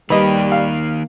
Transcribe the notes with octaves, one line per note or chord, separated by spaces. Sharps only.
D#3 G3 A#3 B4 D#5
F5